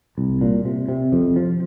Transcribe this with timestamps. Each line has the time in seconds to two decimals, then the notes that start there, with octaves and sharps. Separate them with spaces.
0.18 C2
0.41 A#2
0.65 C3
0.88 C3
1.13 F2
1.36 F3